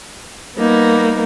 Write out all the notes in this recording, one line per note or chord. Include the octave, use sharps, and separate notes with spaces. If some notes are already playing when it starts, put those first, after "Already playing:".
G3 A#3 B3 D#4